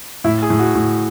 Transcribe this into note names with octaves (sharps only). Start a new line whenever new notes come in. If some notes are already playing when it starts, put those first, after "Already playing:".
A2 E4
G#4
A2
F#4
A2